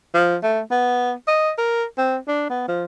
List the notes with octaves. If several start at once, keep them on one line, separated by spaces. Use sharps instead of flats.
F3
A3
B3
D#5
A#4
C4
D4
B3
F3